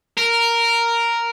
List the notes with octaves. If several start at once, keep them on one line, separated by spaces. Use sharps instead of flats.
A#4